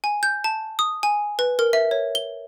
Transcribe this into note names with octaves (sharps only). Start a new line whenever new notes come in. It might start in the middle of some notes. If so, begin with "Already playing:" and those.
G#5
G6
A5
D#6
G#5
B4
A#4
E5
C#5
G7